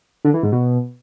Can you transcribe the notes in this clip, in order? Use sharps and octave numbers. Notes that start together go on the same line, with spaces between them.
D3
E3
G#2
B2